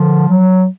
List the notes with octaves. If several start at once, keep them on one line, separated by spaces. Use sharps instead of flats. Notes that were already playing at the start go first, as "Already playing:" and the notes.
Already playing: D3 F3
F#3